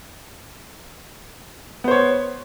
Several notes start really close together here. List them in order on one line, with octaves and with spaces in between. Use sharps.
B3 C5 C#5